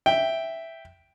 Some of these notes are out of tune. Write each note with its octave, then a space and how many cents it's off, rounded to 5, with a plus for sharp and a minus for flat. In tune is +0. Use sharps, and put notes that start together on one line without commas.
E5 +0 G5 +0